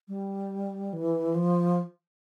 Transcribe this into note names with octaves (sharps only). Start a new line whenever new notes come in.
G3
E3
F3